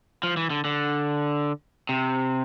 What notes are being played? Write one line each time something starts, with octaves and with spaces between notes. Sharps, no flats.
F3
E3
D3
D3
C3